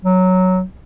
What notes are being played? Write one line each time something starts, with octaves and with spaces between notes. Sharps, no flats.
F#3